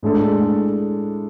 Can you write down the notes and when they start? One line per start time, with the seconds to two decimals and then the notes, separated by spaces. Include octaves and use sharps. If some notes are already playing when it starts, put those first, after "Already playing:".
0.03 A2 G#3 D4 A4